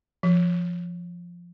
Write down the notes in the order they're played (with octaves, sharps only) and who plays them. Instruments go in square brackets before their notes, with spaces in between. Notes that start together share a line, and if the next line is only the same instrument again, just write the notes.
[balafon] F3